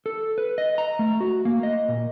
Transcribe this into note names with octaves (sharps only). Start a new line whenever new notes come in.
A4
B4
D#5
A#5
A3
F#4
A#3
D#5
A#2